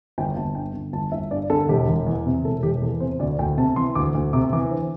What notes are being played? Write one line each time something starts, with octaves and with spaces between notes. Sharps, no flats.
G1 G5
G1 A5
G2 G5
D3
G1 A5
G1 E5
G2 D5
D3 A4
E1 G4
E1
E2
C3
E1 A4
E1 G4
E2 A4
C3 C5
D2 D5
D2 G5
C3 A5
E3 C6
D2 D6
D2
C3 D6
E3 D6
D3 C5